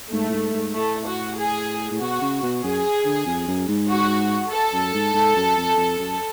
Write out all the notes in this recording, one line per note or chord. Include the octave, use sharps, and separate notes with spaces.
G#2 A3
A2
G#2
G#2
A2 A3
F#4
G#4
A2
B2 F#4
C#3
B2
F#2 G#4
D3
F2
F#2
G#2
F#4
A4
F#2
G#2
G#2
F#2
F2
F2
F#2